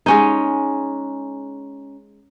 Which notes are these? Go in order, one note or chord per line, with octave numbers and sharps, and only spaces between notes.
G#3 C#4 D#4